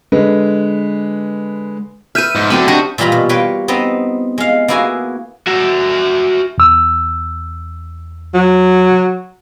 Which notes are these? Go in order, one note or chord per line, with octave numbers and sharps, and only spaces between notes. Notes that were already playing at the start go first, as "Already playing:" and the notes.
D3 G#3 B4
B4 E5 F6 G6 D#7
G#2
D3 F#3 A3 C4 B5
D4 F#4 G4 D#5
A#2 E3 G3 F4 A#5 B5
B2
A#3 B4 C#5 G5
B3 C4 D#4 D#5
G#3 F5
A#3 B3 E4 F#4 G#4 G#5
F#4 E5
E2 E6
F#3